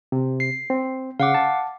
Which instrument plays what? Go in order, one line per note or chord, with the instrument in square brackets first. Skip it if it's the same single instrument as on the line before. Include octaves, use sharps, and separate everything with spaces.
[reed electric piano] C3
[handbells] C7
[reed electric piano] C4
[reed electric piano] C#3 [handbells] F5 F#5 D6
[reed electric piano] A5